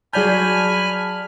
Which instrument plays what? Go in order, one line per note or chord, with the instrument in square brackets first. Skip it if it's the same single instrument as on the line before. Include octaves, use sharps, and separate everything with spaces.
[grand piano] F#3 G6 [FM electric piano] G#4 D5 A5 [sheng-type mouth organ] G#5 B5 F6